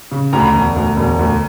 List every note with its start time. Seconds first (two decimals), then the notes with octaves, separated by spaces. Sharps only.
0.11 C#3
0.33 D2 A#5
0.40 B5
0.47 A#5
0.54 E1
0.76 D2
0.97 E1
1.19 D2